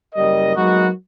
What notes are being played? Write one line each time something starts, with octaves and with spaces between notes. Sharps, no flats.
F#1 G3 A#4 D#5
F#3 G#3 A#3 B3 D#4 F#4